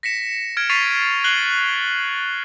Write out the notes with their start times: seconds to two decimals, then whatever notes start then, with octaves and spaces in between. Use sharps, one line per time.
0.03 A#6 B6 C#7 E7
0.57 F6 G#6 D7
0.69 C#6 A6 B6 C7 D#7 F7
1.24 F#6 C7 F#7 G7